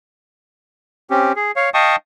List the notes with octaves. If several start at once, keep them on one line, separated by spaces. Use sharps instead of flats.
C4 C#4 G4
G#4
C#5 F5
D#5 F5 G5 A5 C#6 D#6